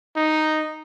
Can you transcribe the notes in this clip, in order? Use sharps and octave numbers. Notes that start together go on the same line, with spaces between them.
D#4